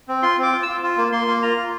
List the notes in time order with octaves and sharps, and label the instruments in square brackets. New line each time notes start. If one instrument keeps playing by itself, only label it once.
[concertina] C4
F4 C6
C4 D6
F4
E6
F4
F4
A#3
A#3 C6
A#3
F4 A#5
F4